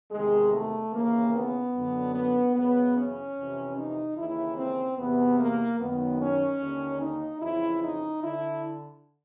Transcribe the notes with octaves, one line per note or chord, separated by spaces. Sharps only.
E2 C3 D#3 G#3
A3
D#2 C#3 E3 A#3
B3
F#2 D3
B3
F#2 C#3 E3 B3
C#4
F2 C3 E3
D#4
D#2 C#3 E3 E4
C4
E2 C3 E3 B3
A#3
F#2 D#3 B3
C#4
D#2 D3
D#4
F2 C#3 E3 E4
D#4
D3 E4